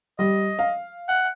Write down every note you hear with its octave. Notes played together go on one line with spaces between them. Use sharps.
G3 D#5
F5
F#5